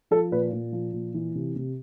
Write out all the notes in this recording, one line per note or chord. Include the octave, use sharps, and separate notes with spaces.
F3 A4
A#2 B4
A#2
F3
A#2
E3
C3
C3